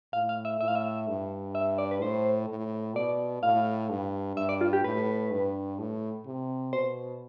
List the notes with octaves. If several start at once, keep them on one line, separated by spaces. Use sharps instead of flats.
A2 F5
F5
E5
A2 E5
F5
E5
G2
E5
D5
B4
A2 C5
A2
B2 D5
A2 F5
G2
G2 E5
D5
F4
G4
A2 B4
G2
A2
C3
B2 C5